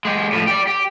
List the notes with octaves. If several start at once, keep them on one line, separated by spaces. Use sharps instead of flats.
G#3 G4
A2 F3
G4 D5
G4